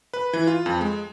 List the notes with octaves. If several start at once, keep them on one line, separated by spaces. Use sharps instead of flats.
B4
E3
F4
F2
G#3